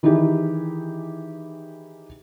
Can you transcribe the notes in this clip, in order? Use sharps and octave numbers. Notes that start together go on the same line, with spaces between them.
D#3 E3 D#4 E4 G4 G#4